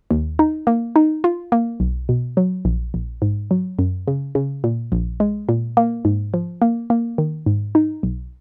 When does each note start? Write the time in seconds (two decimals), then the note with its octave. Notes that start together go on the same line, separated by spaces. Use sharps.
0.11 D#2
0.39 D#4
0.67 A#3
0.96 D#4
1.24 F4
1.52 A#3
1.80 B1
2.09 B2
2.37 F#3
2.65 A#1
2.94 A#1
3.22 G#2
3.51 F#3
3.79 F#2
4.08 C#3
4.35 C#3
4.64 A#2
4.92 A#1
5.20 G#3
5.49 A#2
5.77 A#3
6.05 G#2
6.34 F3
6.62 A#3
6.90 A#3
7.18 D#3
7.46 G#2
7.75 D#4
8.03 B1